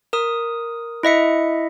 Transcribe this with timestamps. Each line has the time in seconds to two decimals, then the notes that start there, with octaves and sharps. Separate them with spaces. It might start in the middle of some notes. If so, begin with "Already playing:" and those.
0.13 A#4 D#6
1.03 E4 D#5 E5 C#7